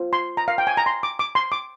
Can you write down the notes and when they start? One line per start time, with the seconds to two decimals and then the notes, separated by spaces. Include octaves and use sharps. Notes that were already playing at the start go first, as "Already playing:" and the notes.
Already playing: F4 C5
0.13 C6
0.37 A#5
0.48 F5
0.58 G5
0.67 G#5
0.77 A#5
0.86 C6
1.03 D6
1.19 D6
1.35 C6
1.52 D6